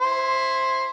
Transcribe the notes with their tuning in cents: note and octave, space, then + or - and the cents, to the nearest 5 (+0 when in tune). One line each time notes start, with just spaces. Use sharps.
E4 +0 C5 +10